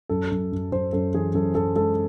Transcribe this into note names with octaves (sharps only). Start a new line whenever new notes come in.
F#2 A4
F#2
F#2
F#2 C5
F#2 A4
E3 G#4
F#2 A4
F#2 A4
G#3 A4